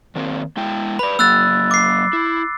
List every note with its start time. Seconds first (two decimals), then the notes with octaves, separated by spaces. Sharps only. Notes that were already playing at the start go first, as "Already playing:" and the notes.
0.15 D#3 A#3 C4
0.57 G#3 E4 G5
0.99 B4 D5 B5
1.19 F#3 A#3 E6 F#6 A6
1.71 D6 C7
2.13 E4